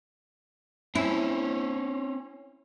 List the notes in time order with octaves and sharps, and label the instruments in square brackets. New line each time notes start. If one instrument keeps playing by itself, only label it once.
[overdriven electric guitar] C4 C#4 [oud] E4